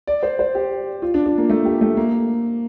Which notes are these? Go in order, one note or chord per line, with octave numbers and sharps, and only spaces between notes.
D5
C5
C5
G4
F4
D4
D4
A#3
A3
G4
A3
A#3